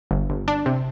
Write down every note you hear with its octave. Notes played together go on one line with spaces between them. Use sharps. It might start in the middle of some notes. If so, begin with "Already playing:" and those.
G1
G1
D4
C3